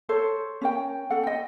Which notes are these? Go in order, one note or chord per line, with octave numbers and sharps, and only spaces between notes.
A4 C5 C#5
C#4 A#4 G5
C#4 A4 F#5
D#5 G5